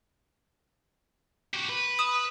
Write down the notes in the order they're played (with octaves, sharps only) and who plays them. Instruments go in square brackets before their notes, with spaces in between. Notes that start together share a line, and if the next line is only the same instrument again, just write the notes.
[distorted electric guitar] F#4 G4
B4
[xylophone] D#6 E7